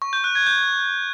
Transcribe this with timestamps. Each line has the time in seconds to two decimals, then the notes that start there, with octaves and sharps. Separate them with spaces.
0.02 C#6
0.13 G6
0.24 F#6
0.35 G#6
0.47 G6